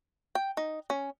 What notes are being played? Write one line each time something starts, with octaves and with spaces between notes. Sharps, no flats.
G5
D#4
C#4